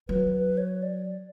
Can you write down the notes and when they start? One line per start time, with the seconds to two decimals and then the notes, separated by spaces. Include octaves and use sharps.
0.08 F#3 B4
0.33 B4
0.57 C#5
0.82 D5